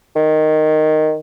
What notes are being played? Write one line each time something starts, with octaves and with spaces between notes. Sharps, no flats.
D#3